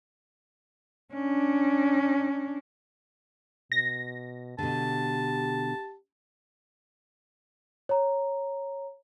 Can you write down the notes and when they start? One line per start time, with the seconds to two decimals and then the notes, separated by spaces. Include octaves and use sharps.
1.13 C#4 D4
3.72 B2 A#6
4.59 B2 D3 G4 A5
7.89 C#5 A#5